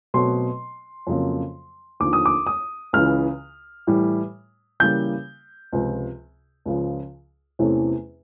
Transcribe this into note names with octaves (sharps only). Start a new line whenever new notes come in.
B2 F#3 A3 C4 C6
F2 C#3 F#3 A#3
D#2 D3 F3 D6
D#6
D6
D#6
C#2 C#3 E3 F6
A2 E3 G3
C#3 E3 G3 A#3 G6
C#2 C3 F3
C#2 C#3 F3
E2 C3 E3 A3 C#4